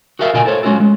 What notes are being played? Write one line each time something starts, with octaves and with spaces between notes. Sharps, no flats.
F#4 G#4 A#4 E5 F5
A#2 C#3 F4 A#4 D#5 G#5
E4 A4 C5 C#5
F#3 G#3 C#4 F4 F#4 A4
G#3